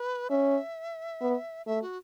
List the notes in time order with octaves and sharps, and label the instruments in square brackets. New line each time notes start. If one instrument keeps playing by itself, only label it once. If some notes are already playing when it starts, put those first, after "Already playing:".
Already playing: [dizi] B4
[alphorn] C#4 [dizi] E5
[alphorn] B3
[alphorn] A3 [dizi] E5
[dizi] F#4